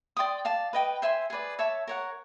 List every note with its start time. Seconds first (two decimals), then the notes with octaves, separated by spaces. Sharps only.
0.17 D5 G5 C6 D#6
0.45 D5 F5 A5
0.73 B4 D#5 G5
1.02 C5 E5 G#5 C6
1.30 G#4 B4 D5
1.59 C#5 E5 A5 C#6
1.88 A#4 C#5 F#5